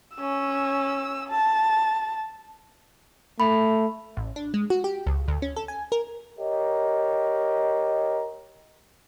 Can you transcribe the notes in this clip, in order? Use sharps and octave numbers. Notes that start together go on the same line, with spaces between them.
C#4 E6
A5
A3 B5
A1
D4
G#3
F#4
G4
C#2
D2
C#4
A4
G#5
A#4
G4 A#4 C#5 D#5